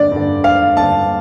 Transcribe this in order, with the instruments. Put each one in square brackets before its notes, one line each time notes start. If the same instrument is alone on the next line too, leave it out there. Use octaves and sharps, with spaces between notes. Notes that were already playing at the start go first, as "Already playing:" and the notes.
Already playing: [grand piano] G2 D3 D5
G2 D3
F5
G2 D3 A5